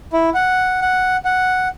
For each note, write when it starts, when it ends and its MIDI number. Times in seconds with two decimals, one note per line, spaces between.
0.13 0.30 64
0.34 0.80 78
0.82 1.17 78
1.25 1.68 78